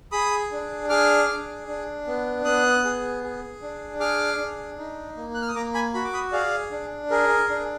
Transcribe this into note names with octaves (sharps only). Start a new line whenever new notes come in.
G#4 B5 D#6
D4
G#4 D6 F6
D4
D4
B3
B3 D#6 F#6
G#4
G#4
D4
G#4 D6 F6
D4
D#4
A#3
F#6
F6
D#6
A#3 A#5 D6
G#5 B5
F#4 B5
D6
B5 D#6
G#4 D5 F5
D4
G#4 A#4
D4